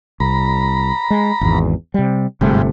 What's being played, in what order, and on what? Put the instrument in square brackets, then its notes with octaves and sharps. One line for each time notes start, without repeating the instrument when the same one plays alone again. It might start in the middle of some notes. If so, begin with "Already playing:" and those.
[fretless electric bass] C2 [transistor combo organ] A#5 B5
[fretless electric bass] G#3
G#1 E2
C3 G3
[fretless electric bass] G1 C3 A3 [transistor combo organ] G#2 G3